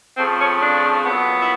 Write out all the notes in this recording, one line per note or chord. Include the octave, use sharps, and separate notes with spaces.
F2 C#3 F3 A3 C4
C#4
D4
A#2 F#3 B3
E4